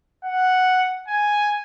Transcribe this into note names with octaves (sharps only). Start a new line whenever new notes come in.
F#5
G#5